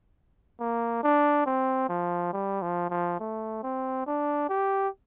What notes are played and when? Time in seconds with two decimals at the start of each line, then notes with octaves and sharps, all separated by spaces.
0.60 A#3
1.03 D4
1.46 C4
1.89 F3
2.33 G3
2.62 F3
2.90 F3
3.20 A3
3.63 C4
4.06 D4
4.49 G4